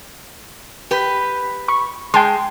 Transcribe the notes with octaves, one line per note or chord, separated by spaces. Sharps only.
G4 B4
B5 C#6
G#3 G5 A5 C6